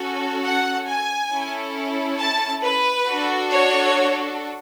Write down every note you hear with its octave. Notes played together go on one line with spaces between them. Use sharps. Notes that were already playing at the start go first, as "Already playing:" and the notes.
Already playing: C#4 F#4 A4
F#5
G#5
C#4 E4 A4
A5
B4
D4 F#4 A4
C#5